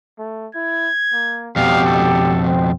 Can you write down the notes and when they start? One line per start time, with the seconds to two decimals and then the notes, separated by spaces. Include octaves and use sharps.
0.19 A3
0.55 E4 G#6
1.12 A#3
1.56 F2 B2 G4 F5
1.87 A4
2.46 C4